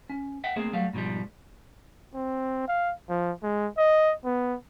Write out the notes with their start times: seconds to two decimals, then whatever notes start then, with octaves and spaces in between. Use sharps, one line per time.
0.10 C#4
0.44 E5 F#5 G5
0.56 A3 A#3 C4 G#4
0.73 F#3 G3 A3 F5
0.93 G#2 B2 E3 F3 G3
2.14 C4
2.68 F5
3.09 F3
3.43 G#3
3.77 D#5
4.25 B3